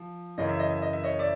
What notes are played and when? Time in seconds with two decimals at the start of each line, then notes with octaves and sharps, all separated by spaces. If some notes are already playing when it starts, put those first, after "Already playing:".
Already playing: F3
0.38 F#2 C#3 E3 D#5
0.49 E5
0.59 D#5
0.70 E5
0.82 D#5
0.93 E5
1.04 C#5 D#5
1.19 D5 E5